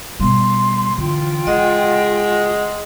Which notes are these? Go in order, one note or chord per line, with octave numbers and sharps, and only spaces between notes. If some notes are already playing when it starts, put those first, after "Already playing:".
B2 G3 C6
D3 E3 F4 G5
C#3 G#3 D#5 F#5